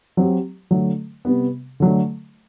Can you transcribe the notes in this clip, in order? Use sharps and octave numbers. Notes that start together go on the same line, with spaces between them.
F#3 C4 G4
D3 F#3 A3
C3 G3 B3
D3 F#3 A3